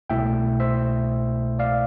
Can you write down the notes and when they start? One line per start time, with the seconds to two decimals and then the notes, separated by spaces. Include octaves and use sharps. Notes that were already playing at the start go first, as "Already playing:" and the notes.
0.10 C2 B2 A3 E4 E5 G5
0.60 C5 E5
1.59 D5 F5